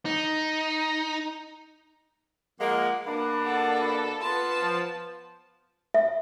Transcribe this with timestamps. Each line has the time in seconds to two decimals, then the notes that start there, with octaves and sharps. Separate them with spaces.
0.05 D#4
2.60 F3 G#3 A#3 F#5
3.06 B2 A#3 D4 B4
3.46 A4 F#5
3.81 B4
4.21 B3 F4 A5
4.62 F3
5.94 E5